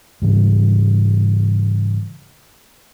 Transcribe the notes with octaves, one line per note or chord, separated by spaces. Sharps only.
G#2 C#3 E3 G3